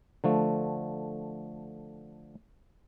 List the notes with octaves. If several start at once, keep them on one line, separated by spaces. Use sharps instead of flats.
D3 F3 A3